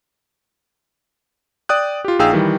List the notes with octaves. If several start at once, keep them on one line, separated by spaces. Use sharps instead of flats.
D5 G5 D#6 F#6
F4 G4
A#1 D#4 G#4 F5 G5 E6
D#3 E3 G3